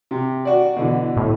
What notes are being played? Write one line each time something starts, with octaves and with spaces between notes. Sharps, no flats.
C3
F#4 D5
B2 D3 E3
A2